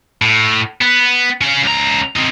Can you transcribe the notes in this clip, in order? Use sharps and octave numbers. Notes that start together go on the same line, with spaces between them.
A2
B3
C#4 F5
C#2 A#5
C4 D#4